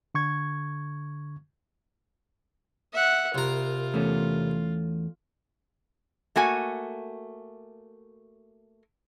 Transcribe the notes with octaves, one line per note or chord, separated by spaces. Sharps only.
D3 C#6 G#6
E5 F#5
C2 F4 A#4
E2 A3 C#4
A3 A#3 F#4 G#5